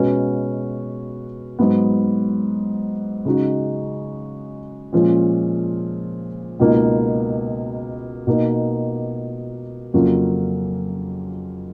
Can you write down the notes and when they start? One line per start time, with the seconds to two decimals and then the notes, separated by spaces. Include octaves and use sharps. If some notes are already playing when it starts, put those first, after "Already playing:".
Already playing: B2 G#3 C#4 F#4 B4
1.59 G#2 F#3 B3
3.25 C#3 G#3 D#4 F#4
4.92 A#2 F3 G#3 C#4
6.59 C#2 B2 A#3 D#4
8.27 B2 A#3 D#4
9.94 F2 C#3 F#3 A#3 F4